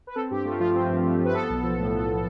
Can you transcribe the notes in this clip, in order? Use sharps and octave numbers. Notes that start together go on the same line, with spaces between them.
B4
C4 A4
G2 G4
A3 F4
F3 F4
C4
G2
A3
F3
B4
B3 A4
B1
F3
A2
B3